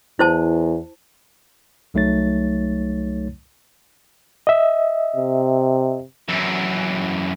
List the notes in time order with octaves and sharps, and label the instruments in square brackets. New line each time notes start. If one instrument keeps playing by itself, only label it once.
[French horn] E2 [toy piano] E4 C5 A5
[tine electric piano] C2 F#3 A3 D#4 C#5 A6
[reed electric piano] D#5 E5
[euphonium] C3
[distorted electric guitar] F#2 E3